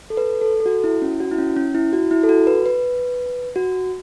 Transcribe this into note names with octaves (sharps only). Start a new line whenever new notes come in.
A4
B4
A4
A4
F#4
F#4
E4
C#4
F#4
E4
C#4
C#4
E4
F#4
E4
A4
F#4
B4
B4
F#4